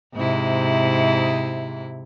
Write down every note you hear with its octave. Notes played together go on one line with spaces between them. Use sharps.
G#2 C3 E4